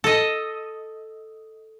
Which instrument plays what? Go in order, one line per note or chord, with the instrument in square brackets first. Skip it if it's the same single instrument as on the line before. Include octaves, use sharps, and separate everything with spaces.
[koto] A4 D#5